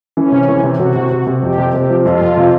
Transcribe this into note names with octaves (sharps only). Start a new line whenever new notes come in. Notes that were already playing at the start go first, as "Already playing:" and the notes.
E3 C#4
C3
E3
C3
C3 F#4
C3
C3
C3
F2 G4
C3
C3 G4
F3
F2 F4
F2
C3